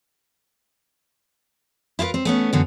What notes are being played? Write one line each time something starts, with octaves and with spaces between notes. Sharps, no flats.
E4 F4 G#4 A#4 B4
C4
A3 B3 C#4
F#2 A2 D3 B3